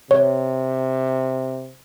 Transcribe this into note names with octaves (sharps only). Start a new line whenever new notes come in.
C3 C#5